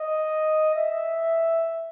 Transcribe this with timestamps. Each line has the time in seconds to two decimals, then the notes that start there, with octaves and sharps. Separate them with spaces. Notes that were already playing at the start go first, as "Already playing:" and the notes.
Already playing: D#5
0.75 E5